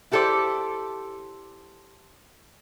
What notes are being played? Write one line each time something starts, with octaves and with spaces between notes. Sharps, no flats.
E4 G4 A4 C5 D5